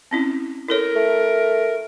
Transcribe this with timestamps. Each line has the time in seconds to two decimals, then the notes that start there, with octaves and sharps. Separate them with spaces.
0.11 C4 C#4 E4
0.69 E4 A4 A#4 C#5
0.96 A3